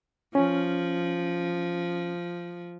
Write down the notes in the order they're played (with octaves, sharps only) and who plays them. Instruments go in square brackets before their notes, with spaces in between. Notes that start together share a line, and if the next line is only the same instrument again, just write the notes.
[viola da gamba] F3 [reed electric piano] C#4